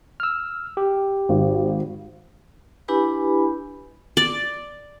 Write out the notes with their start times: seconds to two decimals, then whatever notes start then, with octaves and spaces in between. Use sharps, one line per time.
0.20 E6 F6
0.77 G4
1.29 G#1
2.88 D4 E4 G4 B4 G#5 B5
4.17 D5